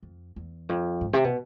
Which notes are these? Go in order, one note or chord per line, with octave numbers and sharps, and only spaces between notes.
F2
E2
F2
G#2
C3
B2